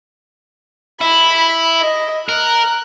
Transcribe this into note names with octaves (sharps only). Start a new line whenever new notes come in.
E4 B5
D#5
A#4 F#6